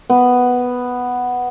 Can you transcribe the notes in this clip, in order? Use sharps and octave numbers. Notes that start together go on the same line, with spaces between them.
B3